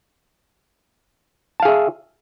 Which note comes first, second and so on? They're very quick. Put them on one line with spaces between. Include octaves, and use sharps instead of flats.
A5 F5 G#4 E5